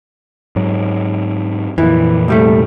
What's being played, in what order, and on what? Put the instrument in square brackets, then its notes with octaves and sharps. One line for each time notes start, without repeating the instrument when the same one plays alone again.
[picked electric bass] G#2 F#3
[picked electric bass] F2 A#2 [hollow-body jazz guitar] E3
[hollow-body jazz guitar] C2 G3 A3